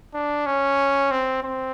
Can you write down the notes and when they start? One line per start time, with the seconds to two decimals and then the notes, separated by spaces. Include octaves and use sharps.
0.14 D4
0.46 C#4
1.11 C4
1.43 C4